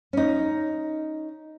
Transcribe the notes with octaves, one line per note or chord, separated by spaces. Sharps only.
C#4 D#4